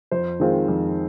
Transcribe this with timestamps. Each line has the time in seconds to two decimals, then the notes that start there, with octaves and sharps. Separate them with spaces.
0.11 F2 C5
0.40 D#3 G#3 C4 F4
0.68 F2